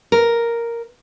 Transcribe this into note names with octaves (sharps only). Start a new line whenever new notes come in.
A#4